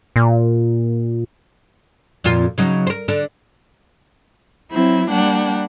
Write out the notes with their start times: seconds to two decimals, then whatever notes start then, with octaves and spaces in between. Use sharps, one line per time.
0.16 A#2
2.24 F2 A#2 F4
2.58 C#3 F#3 D#4
2.87 A#4 C5
3.08 D3 D4
4.71 F#3 C4 E4
5.08 G3 A#3 D4 F#5 G5